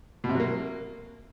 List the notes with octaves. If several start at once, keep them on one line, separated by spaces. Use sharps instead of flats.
B2
C3
F#3
A#3